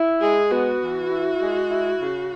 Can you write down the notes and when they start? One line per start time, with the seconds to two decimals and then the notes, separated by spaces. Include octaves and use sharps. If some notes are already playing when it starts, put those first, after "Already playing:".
Already playing: E4
0.21 G#3 G#4
0.51 B3 F#4
0.81 E3
1.10 E4
1.40 G#3
1.70 E4
1.99 C#3